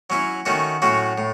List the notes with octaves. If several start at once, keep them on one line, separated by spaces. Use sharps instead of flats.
F#3 C#4 E4
D#3 A3 C#4 F#4
A2 F#3 C#4 F#4
A2